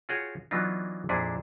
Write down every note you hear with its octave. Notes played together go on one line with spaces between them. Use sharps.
F4 F#4 G#4 C#5 G5
E3 F#3 B3 D4 D#4 F4
F2 A#2 D4 E4 G#4